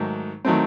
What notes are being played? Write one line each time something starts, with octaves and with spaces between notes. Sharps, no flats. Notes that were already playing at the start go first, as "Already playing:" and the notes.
Already playing: G#2 D#3 F#3 A3
D#3 F#3 A3 C4